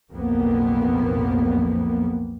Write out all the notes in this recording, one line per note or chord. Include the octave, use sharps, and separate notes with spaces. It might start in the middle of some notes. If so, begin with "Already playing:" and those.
B1 F2 A2 F3 A#3 B3